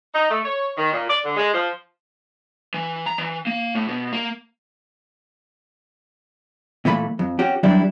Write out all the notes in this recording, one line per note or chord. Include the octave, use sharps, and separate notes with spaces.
D#4
A3
C#5
D#3
A#2
D5
D3
G#3
F3
E3
A#5
E3
A#3
A2
B2
A#3
A#2 E3 A3 B5
F2
C#4 F#4 G4
F#2 E3 F#3 G3 D4 E4